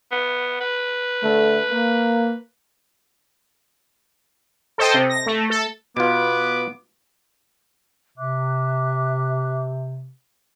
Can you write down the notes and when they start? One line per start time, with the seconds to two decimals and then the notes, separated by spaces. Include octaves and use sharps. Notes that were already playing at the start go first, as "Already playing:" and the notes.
0.11 B3
0.60 B4
1.23 D3 A3
1.70 A#3
4.78 A4 C5 D#5 G5
4.94 C3
5.09 A#6
5.26 A3
5.50 A4
5.97 B2 B3 F4 B4 D6
8.18 C3 E5 D6 F#6